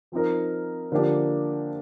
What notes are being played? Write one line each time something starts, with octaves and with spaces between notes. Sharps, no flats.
F3 C4 D#4 A#4
D3 F3 A#3 D4 G4